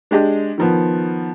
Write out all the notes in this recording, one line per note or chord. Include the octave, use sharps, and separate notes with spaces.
G#3 D4 G4 D#5
D#3 F3 B3